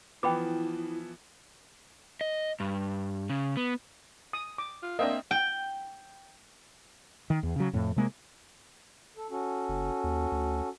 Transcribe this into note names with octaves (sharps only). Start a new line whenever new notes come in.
E3 F3 B3 E4 G5 B5 D6
D#5
G2
C#3
B3
D#6
D6
F4
A#3 C4 D4 D#5 E5
G5
D#3
E2
C#3 F#3
F2 A2
C3 G#3 A#3
A4
C#4 F#4 A4
F#1
D#2
D2